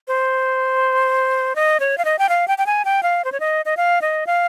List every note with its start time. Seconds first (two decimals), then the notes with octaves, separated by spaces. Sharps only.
0.08 C5
1.56 D#5
1.80 C#5
1.98 F5
2.05 D#5
2.19 G5
2.29 F5
2.48 G5
2.58 G5
2.66 G#5
2.85 G5
3.03 F5
3.25 C5
3.32 C#5
3.40 D#5
3.65 D#5
3.77 F5
4.02 D#5
4.27 F5